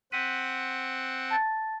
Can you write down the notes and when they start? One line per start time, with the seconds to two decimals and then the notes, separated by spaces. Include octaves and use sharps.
0.12 C4 F#5 F#6 B6 D#7
1.30 A5 A6